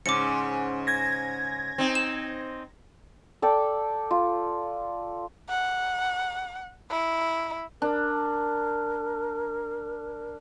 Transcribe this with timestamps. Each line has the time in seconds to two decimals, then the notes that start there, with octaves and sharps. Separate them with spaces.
0.06 G#2 C#3 D6 C#7
0.87 G#6 A#6
1.78 C4 D#4
1.95 E7
3.42 A4 D5 G5
4.11 F4
5.49 F#5
6.90 E4
7.82 D4 A#4